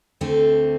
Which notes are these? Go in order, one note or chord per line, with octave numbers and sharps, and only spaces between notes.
D2 D3 A3 C4